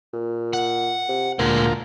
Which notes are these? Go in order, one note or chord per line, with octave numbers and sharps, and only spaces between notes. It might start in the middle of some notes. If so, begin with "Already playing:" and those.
A#2
F#5
C3
D2 A#2 G#3 A#3 F4 A#4